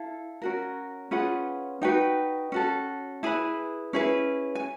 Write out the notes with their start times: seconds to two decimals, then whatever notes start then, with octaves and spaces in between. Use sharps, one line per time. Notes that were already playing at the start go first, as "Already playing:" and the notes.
Already playing: E4 A4 F5
0.42 C#4 F#4 A#4
1.11 C#4 F4 G#4 B4 F#5
1.82 D#4 F#4 B4 G5
2.52 C#4 F#4 A4
3.23 E4 G#4 B4 G#5
3.93 C#4 E4 G#4 B4
4.55 G#5